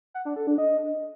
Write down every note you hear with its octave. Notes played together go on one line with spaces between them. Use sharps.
F#5
D4
A4
D4
D#5